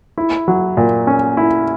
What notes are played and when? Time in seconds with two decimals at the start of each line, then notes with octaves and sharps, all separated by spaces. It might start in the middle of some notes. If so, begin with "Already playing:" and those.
0.18 E4
0.48 F#3
0.77 A#2
1.07 C#4
1.37 E4